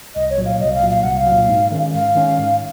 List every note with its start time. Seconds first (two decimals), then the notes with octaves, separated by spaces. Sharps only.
0.15 C2 D#5
0.30 C#5
0.38 A#2 F#3
0.46 F5
0.60 C2 D#5
0.75 F5
0.83 A#2 F#3
0.90 F5
1.03 C2 F#5
1.16 F5
1.26 A#2 F#3
1.49 G#2
1.71 D#3 G#3 C#4
1.94 G#2 F5
2.15 D#3 G#3 C#4
2.38 G#2